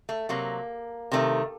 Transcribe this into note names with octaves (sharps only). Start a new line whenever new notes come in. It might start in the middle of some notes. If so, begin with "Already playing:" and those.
A3
C3 F#3 A#3
C3 D#3 A3